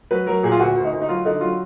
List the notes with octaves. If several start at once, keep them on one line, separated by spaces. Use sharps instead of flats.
F#3 B4
F#3 A#4
A#2 G#4
F4
D2 F#4
D2
D#4
D2
D#4
F#3 F4
D3 D#4
F#3 F4